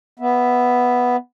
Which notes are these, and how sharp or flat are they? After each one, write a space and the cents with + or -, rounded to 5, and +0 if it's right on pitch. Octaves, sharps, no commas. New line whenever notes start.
B3 +0 E5 +0